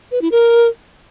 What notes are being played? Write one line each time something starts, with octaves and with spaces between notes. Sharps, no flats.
B4
E4
A#4